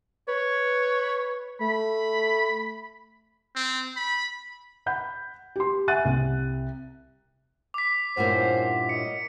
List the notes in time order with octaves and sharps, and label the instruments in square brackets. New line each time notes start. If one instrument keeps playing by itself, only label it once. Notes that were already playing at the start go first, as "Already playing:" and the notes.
[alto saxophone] B4 [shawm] C#5
[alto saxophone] A3 [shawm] B5
[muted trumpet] C4
B5
[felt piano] F#5 B5 G6
G4 C6
E5 F#5 G#5 F#6 A6 D#7
C2
[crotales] D6 B6
[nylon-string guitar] G2 A#2 E4 [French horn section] C#4 A#4 C5 [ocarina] F#5
[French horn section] A#4 C#5 D#5 [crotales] C#7